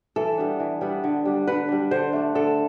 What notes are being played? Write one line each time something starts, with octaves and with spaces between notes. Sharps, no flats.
E3 A4
G3 B3 D4
E3
G3 B3 D4
D3
G3 D4
D3 B4
G3 D4
D3 C5
A3 D4
D3 A4